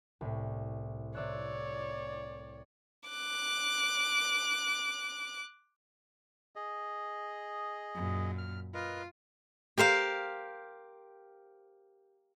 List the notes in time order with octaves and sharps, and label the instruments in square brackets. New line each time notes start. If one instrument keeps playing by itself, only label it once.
[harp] C2 A2
[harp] C3 E6 F#6 [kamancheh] C#5 D5
[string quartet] D6 F#6
[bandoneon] G#4 D#5
[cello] F#2 A#2
[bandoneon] F6
[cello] F4 [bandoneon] A#4 B4 D#5
[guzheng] G4 A#4 C5 F5